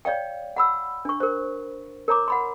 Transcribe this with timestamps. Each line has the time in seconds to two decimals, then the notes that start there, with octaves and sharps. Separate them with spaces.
0.05 C#5 D5 F5 G5
0.57 F#5 B5 E6
1.05 D4 C#6
1.20 A#4 C5
2.08 A#4 C#5 A#5 D6
2.28 F#5 B5 C6